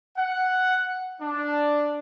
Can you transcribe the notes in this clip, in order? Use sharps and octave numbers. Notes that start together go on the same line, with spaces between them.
F#5
D4